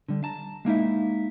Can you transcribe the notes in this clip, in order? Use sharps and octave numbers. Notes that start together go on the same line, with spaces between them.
D3 G3
A5 A#5
G#3 A#3 D#4 E4